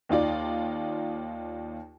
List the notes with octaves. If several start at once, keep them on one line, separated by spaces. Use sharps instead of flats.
D#2 D#4 F4 D5